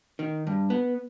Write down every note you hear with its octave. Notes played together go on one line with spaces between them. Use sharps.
D#3
G2
B3